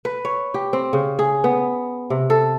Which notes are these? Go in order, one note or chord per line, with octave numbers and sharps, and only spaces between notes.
B4
C#5
G4
C4
C#3
G#4
B3
C3
A4